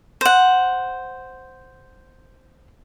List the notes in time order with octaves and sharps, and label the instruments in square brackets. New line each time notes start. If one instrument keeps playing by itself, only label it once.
[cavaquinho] C5 F#5